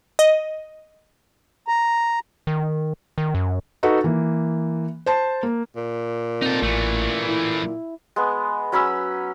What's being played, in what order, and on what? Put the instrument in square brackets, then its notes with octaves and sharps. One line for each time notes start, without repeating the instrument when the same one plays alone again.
[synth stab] D#5
[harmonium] A#5
[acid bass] D#3
D#3
F#2
[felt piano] D#4 F#4 A4 B4
E3 A#3
C5 A5
A#3
[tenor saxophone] A#2
[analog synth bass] C4 [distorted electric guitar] D#4 A4
[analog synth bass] A1 [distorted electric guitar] E3 A3
[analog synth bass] E4
[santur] G#3 B3
F#3 C#4 B5 E6